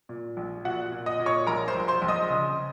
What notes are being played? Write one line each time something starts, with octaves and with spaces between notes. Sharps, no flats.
A#2
A#1
A#2 F#4 F#5
A#2
D#5 D#6
A#2
C#5 C#6
A#1 A#4 A#5
C5 C6
A#1
C5 C6
A#1
D#5 D#6
C#3